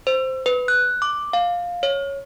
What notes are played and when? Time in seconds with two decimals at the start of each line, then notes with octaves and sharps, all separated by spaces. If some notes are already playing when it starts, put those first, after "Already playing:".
0.07 C5
0.46 B4
0.68 F#6
1.02 D6
1.33 F5
1.83 C#5